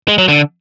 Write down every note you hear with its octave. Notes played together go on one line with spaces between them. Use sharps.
G#3
F#3
D3